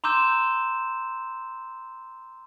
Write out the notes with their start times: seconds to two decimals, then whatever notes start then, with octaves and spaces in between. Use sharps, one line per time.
0.04 A#5 C6 D6 E6 G6 E7